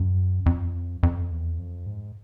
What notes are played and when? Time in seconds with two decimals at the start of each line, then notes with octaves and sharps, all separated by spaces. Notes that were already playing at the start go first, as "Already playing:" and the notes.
Already playing: F#2
0.46 F2
1.03 F2
1.31 E2
1.59 F2
1.86 G#2